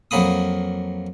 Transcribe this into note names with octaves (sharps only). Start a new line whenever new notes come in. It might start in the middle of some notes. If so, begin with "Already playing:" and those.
F2 F#3 A#3 B5 D#6